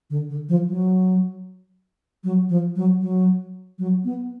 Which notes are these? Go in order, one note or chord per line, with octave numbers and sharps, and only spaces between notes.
D3
D3
F3
F#3
F#3
F3
F#3
F#3
F#3
B3